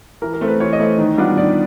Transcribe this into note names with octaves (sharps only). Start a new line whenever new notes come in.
E3 A#4
A#4
A3 C4
B4
E3 C#5
D#5
A3 C4
D#3
G3 B3 D4 F4
D#3 D5